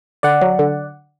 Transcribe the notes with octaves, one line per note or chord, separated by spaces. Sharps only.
D3 D5 F#5
F#3
D3